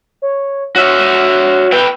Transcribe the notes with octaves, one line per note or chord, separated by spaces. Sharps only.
C#5
F#4 C#5 E5
E4 B4 G5